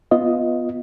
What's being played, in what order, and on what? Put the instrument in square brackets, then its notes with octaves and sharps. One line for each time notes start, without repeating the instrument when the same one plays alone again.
[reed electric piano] B3 F4 D#5